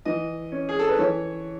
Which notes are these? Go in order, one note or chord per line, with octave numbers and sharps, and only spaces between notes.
E3 D#5
C#4
G#4
A4
B4
E3 C#5